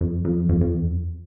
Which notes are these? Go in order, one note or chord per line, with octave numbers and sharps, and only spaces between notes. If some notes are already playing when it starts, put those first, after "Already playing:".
F2
F2
F2
F2
E2
F2